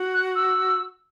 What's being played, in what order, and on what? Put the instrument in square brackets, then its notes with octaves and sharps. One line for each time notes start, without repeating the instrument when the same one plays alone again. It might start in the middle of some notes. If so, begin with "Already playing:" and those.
Already playing: [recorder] F#4
[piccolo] F#6
E6